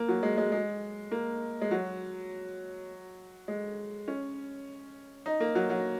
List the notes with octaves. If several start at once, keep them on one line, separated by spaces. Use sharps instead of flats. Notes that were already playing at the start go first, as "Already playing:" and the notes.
Already playing: A#3
F#3
G#3
G#3
G#3
A#3
G#3
F#3
G#3
C#4
D#4
A#3
F#3
F#3